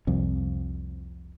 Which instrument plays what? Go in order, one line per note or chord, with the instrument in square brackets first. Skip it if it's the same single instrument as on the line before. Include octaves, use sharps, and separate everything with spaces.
[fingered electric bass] C2 F2